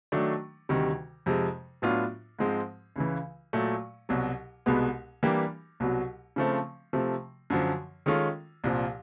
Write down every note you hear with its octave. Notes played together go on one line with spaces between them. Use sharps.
D#3 F#3 A3 D4
D2 C3 D#3 G3
F2 C3 F3 G#3
A2 F#3 B3 D4 F4
G#2 F3 G#3 C4
C#2 C#3 E3
A#2 F#3 A3
C2 B2 F#3
C2 B2 G#3 B3
E3 G3 A#3 D4 G4
C2 B2 F#3
C#3 F3 A3 C4
C3 F3 A3
F#2 D3 F3
D#3 G#3 C#4 F4 A4
C2 A#2 F3